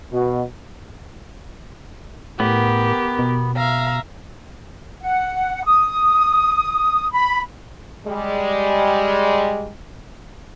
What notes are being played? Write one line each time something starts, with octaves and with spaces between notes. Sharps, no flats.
B2
A2 B3 G4 A#4
B2
E5 F5 A#5
F#5
D#6
B5
G3 G#3